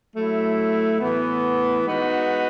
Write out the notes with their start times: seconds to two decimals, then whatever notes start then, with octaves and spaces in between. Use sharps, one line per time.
0.15 F#3 A3 E4
1.01 A2 E3 B3
1.85 G#3 B3 D#4 F#4